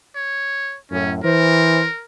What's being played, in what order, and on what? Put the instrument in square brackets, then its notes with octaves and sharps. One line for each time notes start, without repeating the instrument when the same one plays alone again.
[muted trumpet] C#5
[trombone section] F#2 A2 [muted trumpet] C#4
[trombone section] E3 C5 [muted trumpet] A#4